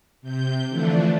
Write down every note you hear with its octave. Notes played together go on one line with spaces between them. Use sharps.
C3 G6
D3 E3 F3 A3 D4